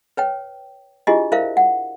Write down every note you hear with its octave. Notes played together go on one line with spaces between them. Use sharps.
B4 C#5 G5
D4 E4 F4 G4 G#4 D#5
E4 A#4 C5 E5 F5
F#5